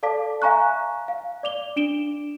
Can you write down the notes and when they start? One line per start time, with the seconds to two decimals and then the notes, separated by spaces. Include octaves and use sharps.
0.03 A4 D5 F5 A5 D6 B6
0.42 E5 F5 G#5 A#5 C#6 F#6
1.08 F5
1.43 D5 D6 F7 G7
1.76 D4 D7 E7 G7